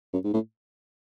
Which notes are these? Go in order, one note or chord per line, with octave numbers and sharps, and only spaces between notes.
F#2
G#2
A2